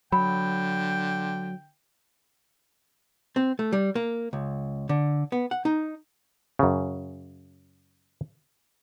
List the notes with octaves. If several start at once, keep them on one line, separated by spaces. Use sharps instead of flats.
D3 F#3 G5 B5
C4
A3
G3
A#3
C#2
D3
B3
F#5
D#4
F#2 C#3